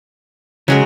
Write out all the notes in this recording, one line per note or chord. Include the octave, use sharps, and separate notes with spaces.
C#3 F#3 G#3 A#4